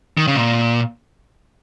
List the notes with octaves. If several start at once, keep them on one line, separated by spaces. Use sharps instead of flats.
D#3
C#3
A#2